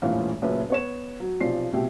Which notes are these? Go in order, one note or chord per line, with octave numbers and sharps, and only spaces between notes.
E1 A1 A#2 E3 F3 F5
F#1 F#2 A#2 B4 E5
B3 C#5 E7
F#3
B1 C3 F3 D5 C7
C2 B2 F3 G4 E5